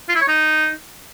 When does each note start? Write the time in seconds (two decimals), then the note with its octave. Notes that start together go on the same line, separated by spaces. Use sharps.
0.09 F4
0.15 E4
0.21 C#5
0.28 D#4